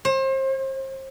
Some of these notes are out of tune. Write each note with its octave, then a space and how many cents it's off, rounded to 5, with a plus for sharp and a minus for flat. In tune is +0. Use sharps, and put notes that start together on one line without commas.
C5 +35